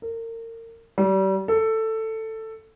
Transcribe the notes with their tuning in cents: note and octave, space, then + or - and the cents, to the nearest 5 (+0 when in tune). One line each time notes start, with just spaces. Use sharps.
A#4 -35
G3 -35
A4 +10